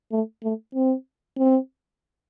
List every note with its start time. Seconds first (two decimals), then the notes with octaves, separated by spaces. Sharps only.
0.12 A3
0.43 A3
0.75 C4
1.38 C4